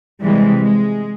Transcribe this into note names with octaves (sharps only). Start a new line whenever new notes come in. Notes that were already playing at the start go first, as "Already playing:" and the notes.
C3 E3 G3 G#3
G#3